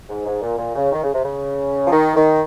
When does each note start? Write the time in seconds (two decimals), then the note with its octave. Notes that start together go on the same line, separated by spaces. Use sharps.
0.09 G#2
0.26 G#2
0.41 A#2
0.58 A#2
0.75 C#3
0.92 D#3
1.03 C#3
1.13 C3
1.24 C#3
1.86 F3
1.92 D#3
2.16 D#3